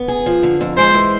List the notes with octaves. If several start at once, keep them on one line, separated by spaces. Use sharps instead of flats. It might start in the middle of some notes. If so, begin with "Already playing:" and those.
Already playing: B3
G#4
F3
D3
F2
G#3 C5
E3